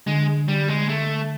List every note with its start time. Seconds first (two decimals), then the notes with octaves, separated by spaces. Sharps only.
0.07 D3 G#3
0.48 G3
0.68 G#3
0.89 A3